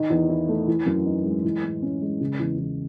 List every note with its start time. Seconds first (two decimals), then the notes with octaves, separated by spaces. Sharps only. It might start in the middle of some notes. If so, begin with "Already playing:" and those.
Already playing: D#3
0.10 E2
0.29 E4
0.48 A3
0.67 E3
0.86 F#2
1.06 D#4
1.24 G#3
1.44 E3
1.63 A2
1.82 C#4
2.01 G#3
2.21 C#3
2.39 E2
2.59 E2